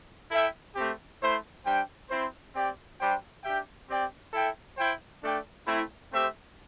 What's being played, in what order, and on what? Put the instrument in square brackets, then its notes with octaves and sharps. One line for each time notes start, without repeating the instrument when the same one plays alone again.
[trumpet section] E4 A4 E5 G5
A3 C4 G4
A3 E4 C5
G3 D4 C5 G5
C4 E4 C5
C4 G4 D5 G5
G3 D4 G4 C5 G5
D4 G4 E5 G5
C4 G4 D5 G5
E4 A4 E5 G5
E4 C5 G5
A3 D4 A4 D5 G5
A3 C4 E4
A3 C4 G4 C5 E5